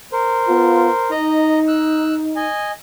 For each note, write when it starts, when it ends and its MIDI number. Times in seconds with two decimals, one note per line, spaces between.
0.12 1.11 70
0.12 1.11 72
0.48 0.89 59
0.48 0.89 65
1.11 2.46 63
1.11 1.59 75
1.11 1.59 82
1.68 2.14 88
1.68 2.14 90
2.36 2.71 75
2.36 2.71 80